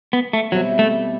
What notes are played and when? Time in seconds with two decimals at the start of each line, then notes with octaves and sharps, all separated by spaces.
0.13 B3
0.33 A3
0.52 B2 F#3 G3 C4 E4
0.79 A3